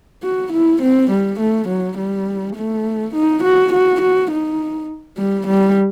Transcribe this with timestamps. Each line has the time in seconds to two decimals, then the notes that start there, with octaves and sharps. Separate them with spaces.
0.23 F#4
0.53 E4
0.82 C4
1.11 G3
1.40 A3
1.68 F#3
1.98 G3
2.56 A3
3.14 D#4
3.43 F#4
3.73 F#4
4.01 F#4
4.31 D#4
5.18 G3
5.47 G3